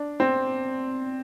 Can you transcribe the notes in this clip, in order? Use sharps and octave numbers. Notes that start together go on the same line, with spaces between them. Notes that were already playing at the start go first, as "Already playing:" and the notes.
Already playing: D4
C4